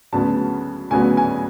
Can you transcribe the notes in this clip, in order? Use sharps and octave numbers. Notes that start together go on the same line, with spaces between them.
D2 C#3 F#3 B3 A5
D2 C#3 F#3 B3 G#5
G#5